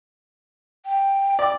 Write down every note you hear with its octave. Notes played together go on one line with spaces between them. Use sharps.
G5
D5 D6